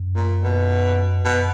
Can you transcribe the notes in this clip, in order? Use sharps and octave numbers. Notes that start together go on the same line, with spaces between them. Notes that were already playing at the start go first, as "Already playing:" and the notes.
Already playing: F#2
A#2
B2
F#2 B2